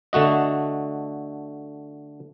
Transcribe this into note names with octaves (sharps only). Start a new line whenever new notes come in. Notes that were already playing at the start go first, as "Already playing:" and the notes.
D3 A3 F#4 D#5